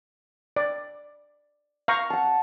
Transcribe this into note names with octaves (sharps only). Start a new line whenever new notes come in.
D5
F5 A#5 C#6
F#5 A5